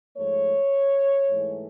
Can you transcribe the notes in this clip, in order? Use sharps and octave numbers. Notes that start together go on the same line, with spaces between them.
G#2 F3 A3 C#5
G#2 E3 A3